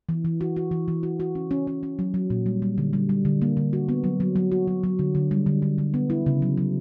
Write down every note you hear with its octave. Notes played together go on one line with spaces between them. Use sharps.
E3
E3
F#4
F#4
E3
E3
F#4
F#4
C#4
C#4
C#4
C#4
F#3
F#3
A#2
G3
G3
D3
G3
G3
D3
A#3
D3
F#4
B3
F#3
F#3
F#3
F#4
F#3
F#3
D3
D3
G3
D3
D3
D3
B3
E4
C#3
F#3
F#3